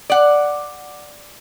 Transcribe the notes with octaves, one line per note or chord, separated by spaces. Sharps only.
D5 F#5